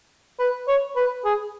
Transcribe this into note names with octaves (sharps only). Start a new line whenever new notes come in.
B4
C#5
B4
G#4